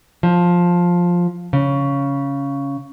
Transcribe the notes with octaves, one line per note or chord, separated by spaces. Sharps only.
F3
C#3